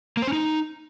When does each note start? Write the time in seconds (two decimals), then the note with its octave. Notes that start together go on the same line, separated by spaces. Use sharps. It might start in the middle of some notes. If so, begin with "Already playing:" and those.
0.17 A#3
0.22 C5
0.27 C#4
0.33 D#4